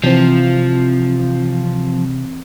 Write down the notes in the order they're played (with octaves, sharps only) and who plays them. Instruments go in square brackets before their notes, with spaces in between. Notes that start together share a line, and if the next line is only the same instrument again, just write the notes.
[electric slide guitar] C3 [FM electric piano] E3 C4 [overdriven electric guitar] F3